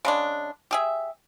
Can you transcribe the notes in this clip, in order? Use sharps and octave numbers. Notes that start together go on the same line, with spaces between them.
C#3 G#3 D4
G4 G#4 E5